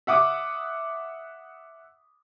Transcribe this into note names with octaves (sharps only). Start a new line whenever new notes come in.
E5 F#5 D6 D#6